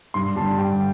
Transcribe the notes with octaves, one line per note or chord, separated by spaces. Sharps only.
G2 C6
D3 G3 A5
G2 G5